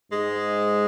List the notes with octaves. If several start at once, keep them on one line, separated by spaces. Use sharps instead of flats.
G#2 G#3